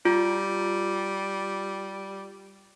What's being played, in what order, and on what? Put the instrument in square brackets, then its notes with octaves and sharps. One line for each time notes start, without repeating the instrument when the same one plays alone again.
[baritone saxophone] G3 [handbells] F4